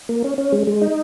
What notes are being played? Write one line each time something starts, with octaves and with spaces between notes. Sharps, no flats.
A#3
C#4
C#4
G#3
G#3
D#4